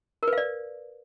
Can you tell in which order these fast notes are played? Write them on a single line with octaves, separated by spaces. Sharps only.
A#4 B4 F5 D5